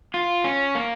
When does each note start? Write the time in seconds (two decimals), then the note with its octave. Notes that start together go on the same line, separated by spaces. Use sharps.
0.14 F4
0.44 C#4
0.75 A#3